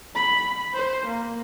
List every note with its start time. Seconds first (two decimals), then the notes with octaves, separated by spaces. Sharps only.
0.15 B5
0.74 C5
1.07 A#3